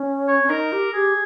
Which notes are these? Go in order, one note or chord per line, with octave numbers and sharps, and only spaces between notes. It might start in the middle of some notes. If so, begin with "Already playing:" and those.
Already playing: C#4
C#5
C#4
D#4 A#4
G4
G4 G#4